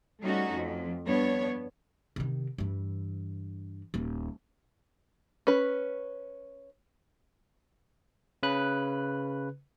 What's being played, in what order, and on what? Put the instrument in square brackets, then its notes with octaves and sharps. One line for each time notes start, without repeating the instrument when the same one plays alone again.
[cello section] G3 A3 C#4 D#4 F#4
F2
G2 B3 D4 C#5
[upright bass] C3 D#3
G2 E3
D#1 D#2
[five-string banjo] C#4 B4
[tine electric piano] C#3 B4 F#6